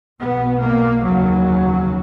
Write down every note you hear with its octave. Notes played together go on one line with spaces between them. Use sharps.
B1 B2 B3
A#3
F1 D#2 C#3 F#3